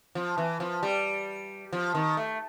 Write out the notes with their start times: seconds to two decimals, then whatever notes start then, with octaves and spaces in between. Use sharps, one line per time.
0.15 F3
0.38 E3
0.60 F3
0.83 G3
1.73 F3
1.95 D#3
2.17 A3